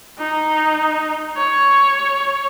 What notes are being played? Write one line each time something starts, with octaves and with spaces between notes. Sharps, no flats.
D#4
C#5